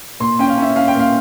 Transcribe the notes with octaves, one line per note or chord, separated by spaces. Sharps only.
A#2 C6
C#4 G5
F5
C#4 E5
C#4 F5
G5
A#2 F5